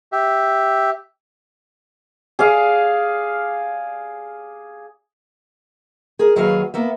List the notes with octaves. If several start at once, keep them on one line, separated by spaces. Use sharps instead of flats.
G4 E5
G#4 D5 F5
G#4 A#4
D#2 F#3 F#4 G#4 B4 F5
A#3 B3 E5